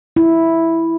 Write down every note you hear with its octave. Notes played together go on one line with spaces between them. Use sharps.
E4